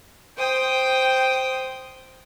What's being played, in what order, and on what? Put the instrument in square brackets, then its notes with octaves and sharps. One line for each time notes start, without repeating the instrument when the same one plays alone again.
[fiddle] C5 D#6 [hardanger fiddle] G5